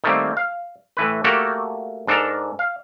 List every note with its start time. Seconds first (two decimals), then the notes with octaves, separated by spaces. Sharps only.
0.04 D#3 G3 A3 A#3 C4
0.37 F5
0.97 A2 E3 B4
1.24 A3 A#3 F#4 G4 A4 A#4
2.07 G#2 D4 A4 A#4
2.59 F5